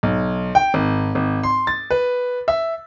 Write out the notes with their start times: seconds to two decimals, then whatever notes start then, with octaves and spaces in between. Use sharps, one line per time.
0.03 B1
0.55 G5
0.74 G#1
1.15 G#1
1.43 C6
1.67 A6
1.91 B4
2.48 E5